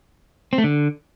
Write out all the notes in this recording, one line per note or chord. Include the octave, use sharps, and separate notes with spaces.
C4
A3
D3